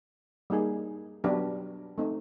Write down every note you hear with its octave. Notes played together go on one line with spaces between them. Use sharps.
G3 A#3 D#4 G#4
F#3 B3 D4 G4 B4
A3 C4 D#4